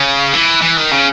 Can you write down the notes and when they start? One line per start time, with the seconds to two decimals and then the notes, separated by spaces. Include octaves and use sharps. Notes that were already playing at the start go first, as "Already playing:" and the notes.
Already playing: C#3
0.34 E3
0.62 E3
0.77 D#3
0.92 C#3